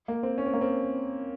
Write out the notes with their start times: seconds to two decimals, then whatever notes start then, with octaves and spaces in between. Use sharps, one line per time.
0.08 A#3
0.23 C4
0.38 C#4
0.46 C4
0.54 A#3
0.61 C4